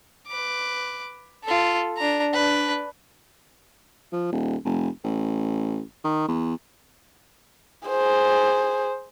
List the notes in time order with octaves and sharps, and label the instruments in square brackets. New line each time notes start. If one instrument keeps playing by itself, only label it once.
[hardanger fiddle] B4 D6
F4 A4
D4 A#5
D4 B4
[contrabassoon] F3
D#1
F1
A1
D#3
E2
[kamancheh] G#4 C5